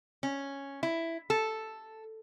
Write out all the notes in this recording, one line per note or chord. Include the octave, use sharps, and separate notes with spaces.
C#4
E4
A4